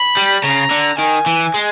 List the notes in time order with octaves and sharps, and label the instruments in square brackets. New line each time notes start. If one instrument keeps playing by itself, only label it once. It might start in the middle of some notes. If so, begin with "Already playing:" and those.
Already playing: [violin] B5
[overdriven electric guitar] G3
[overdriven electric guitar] C#3 [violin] A#5
[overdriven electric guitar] D3
[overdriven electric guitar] D#3 [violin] G#5
[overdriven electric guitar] E3
G#3